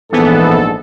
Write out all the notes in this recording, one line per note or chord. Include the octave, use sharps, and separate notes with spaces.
A#1 G#2 E3 B3 A4